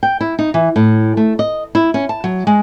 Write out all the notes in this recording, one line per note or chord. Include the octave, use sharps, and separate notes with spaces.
G5
E4
D#4
E3
A2
A3
D#5
E4
C#4
A5
F#3
G#3